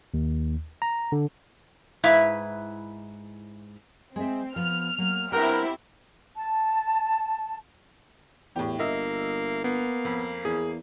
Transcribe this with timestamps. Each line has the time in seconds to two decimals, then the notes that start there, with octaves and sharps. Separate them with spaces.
0.14 D#2
0.82 A#5
1.12 D3
2.04 G#2 E4 B4 E5 F5
4.16 G#3 C4 E5
4.56 F3 B3 F6
4.98 F#3 A#3
5.32 G2 C4 E4 G4 A#4 F#5
6.36 A5
8.56 E2 A2 G4
8.79 G1 A#3 D#5 E5
9.64 A#3 B3
10.05 F2
10.45 E2 G#4